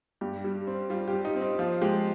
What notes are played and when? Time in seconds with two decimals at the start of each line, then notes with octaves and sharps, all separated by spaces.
0.21 G2 G4
0.44 G3
0.67 C4
0.90 G3 F4
1.08 G4
1.13 G3
1.25 D#4
1.36 C4
1.42 D#4
1.59 F3 F4
1.82 G#3 G4